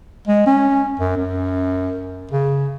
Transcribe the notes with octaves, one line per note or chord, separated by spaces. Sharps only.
G#3
C#4
F#2
F#2
C#3